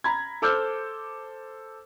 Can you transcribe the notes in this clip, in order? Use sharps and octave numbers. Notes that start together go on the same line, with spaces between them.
A#5 B5 G#6
A4 C5 D6 E6 F6 G6